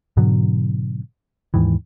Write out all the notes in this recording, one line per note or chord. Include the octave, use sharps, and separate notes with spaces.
G#2 B2 D3 F#3
D#2 G#2 D#3 E3